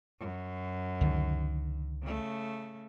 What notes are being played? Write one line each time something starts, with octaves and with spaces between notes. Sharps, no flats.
F#2
C#2 D3 D#3
C#3 A3